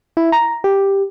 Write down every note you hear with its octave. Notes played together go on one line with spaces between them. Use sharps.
E4
A#5
G4